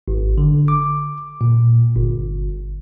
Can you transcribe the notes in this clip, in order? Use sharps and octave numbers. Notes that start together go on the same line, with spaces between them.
G#1
D3
D6
A#2
G1